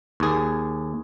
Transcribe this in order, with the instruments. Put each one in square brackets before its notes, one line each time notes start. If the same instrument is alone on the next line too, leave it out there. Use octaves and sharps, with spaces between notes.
[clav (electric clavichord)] D#2 G#4